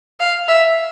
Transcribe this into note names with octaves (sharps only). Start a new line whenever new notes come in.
F5
E5